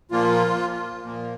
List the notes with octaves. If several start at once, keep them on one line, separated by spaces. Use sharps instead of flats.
A#2 F3 A#3 F4
A#2 F3 A#3